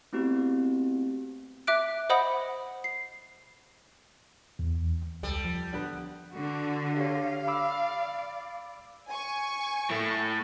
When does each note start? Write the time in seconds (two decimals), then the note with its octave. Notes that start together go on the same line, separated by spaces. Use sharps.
0.13 A3 B3 C4 E4 F#4 G4
1.67 E5 D6 F#6 D7
2.10 C5 D#5 F#5 B5 D#6
2.84 C7
4.59 E2
5.23 C#2 G3 A4
5.45 F3
5.73 D3 B3 B4
6.33 D3 F#4
6.97 G4 C#5 F5
7.48 D5 B5 D6 E6
9.09 G#5 C#6
9.90 A2 A3